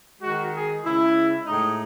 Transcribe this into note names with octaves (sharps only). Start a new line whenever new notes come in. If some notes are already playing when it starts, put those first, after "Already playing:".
D#3 G#3 F#4
G#4
C#3 G#3 E4
A2 G#3 D#4